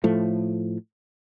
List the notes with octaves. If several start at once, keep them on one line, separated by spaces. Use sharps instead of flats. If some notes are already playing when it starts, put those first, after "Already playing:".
A2 F3 A3